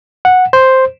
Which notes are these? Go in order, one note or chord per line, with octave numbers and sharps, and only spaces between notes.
F#5
C5